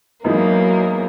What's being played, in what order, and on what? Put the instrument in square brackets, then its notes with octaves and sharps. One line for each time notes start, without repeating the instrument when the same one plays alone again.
[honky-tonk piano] F#2 E3 G#3 B3 D#4 [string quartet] F#3 A#3